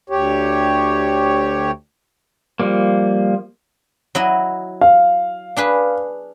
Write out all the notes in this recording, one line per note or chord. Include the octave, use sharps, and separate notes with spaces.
D2 G4 C#5
F3 G3 A#3
F#3 E4 D#5
F5
D4 G#4 B4